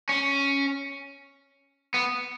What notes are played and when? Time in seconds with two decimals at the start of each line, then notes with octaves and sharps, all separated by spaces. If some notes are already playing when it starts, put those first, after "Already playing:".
0.09 C#4
1.94 B3